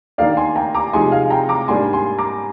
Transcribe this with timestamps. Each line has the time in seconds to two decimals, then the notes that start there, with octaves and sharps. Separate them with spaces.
0.18 D#3 A#3 D4 D5 F5
0.37 G#5 C6
0.56 G5 A#5
0.74 A#5 D6
0.93 C3 F3 G#3 D#4 G#5 C6
1.12 F5 G#5
1.30 G5 A#5
1.49 A#5 D6
1.68 G#2 G3 A#3 D4 G#5 C6
1.93 G#5 C6
2.18 A#5 D6